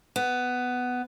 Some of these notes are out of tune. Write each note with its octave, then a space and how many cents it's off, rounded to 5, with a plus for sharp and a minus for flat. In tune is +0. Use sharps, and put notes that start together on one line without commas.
B3 +10